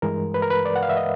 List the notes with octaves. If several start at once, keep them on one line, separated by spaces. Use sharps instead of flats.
G2 E3 G#3 A#4
B4
A#4
B4
D5
F#5
F5
E5
D#5